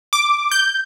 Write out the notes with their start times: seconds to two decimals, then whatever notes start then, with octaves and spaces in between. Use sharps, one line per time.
0.13 D6
0.51 G6